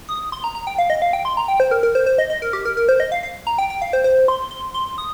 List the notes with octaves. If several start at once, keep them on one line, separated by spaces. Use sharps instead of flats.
D#6
C6
A#5
A#5
G5
F5
D#5
F5
G5
C6
A#5
G5
C5
A#4
A#4
C5
C5
D#5
D#5
A#4
G4
A#4
A#4
C5
D#5
F5
F5
A#5
G5
G5
F5
C5
C5
C6
C6
C6
D#6